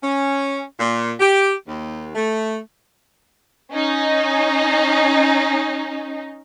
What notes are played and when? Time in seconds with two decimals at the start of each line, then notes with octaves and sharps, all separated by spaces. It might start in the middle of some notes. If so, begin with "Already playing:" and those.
0.03 C#4
0.80 A#2
1.20 G4
1.67 D#2
2.15 A3
3.72 C#4 D#4